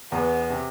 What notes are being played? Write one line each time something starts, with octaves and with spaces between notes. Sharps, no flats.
E2 B3
C3